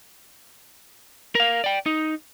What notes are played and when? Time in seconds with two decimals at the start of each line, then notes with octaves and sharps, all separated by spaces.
1.35 A#4 F5
1.64 D5 G5
1.86 D#4